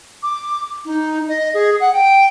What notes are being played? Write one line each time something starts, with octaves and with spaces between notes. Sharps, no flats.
D6
D#4
D#5
G#4
F#5
G5